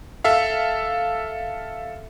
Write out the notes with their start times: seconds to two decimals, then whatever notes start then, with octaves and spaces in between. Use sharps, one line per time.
0.24 A4 E5 F5